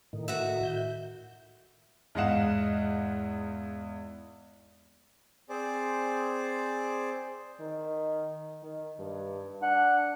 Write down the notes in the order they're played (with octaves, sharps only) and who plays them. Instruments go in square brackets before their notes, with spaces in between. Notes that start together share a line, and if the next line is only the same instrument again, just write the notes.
[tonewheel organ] A2 D#3
[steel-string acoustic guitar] F#4 E5
[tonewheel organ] G6
[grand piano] E2 G#2 D#5 F5 F#5 E7
[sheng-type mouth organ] C4 G#4 C5 D5
[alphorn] D#3
D#3
G2
[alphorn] D4 [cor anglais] F#5